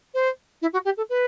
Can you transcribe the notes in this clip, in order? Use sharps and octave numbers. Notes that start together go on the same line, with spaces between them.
C5
E4
F#4
G4
A4
B4